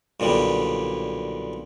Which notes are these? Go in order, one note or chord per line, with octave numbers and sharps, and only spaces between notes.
B1 A#2 D3 G3